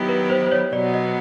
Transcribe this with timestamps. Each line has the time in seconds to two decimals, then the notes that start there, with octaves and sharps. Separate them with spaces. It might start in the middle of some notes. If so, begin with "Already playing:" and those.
Already playing: D#3 F#3 B3 E4 G4
0.09 B4
0.30 C5
0.46 C5
0.52 C#5
0.72 B2 F#3 B3 D5
0.94 D#5